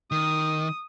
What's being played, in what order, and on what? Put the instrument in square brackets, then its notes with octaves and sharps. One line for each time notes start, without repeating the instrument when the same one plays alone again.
[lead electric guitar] D#3 [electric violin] D#6